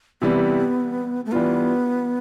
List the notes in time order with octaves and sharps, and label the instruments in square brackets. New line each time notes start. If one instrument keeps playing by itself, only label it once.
[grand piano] C3 E3 G3 [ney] B3
[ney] A3
[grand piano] E3 G3 D4 F4 [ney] B3